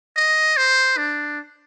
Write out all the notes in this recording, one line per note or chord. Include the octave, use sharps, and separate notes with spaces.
D#5
C5
D4